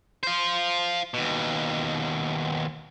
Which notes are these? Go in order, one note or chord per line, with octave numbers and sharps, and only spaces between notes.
F4 C5
D#2 B2